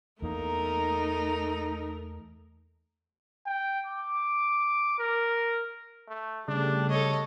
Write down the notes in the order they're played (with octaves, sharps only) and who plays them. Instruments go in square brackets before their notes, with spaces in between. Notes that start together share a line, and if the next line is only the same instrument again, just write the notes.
[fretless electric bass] E2 A#3 [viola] A3 A#4 [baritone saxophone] D#4
[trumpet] G5
D6
A#4
[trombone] A3
[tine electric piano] C#3 [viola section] G3 A3 [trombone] D4
[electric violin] A4 D#5 [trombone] C#5